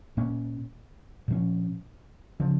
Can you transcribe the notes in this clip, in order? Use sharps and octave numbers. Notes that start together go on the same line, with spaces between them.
A#2 A#3 C#4
A#2 F3 C#4
C#3 F3 C#4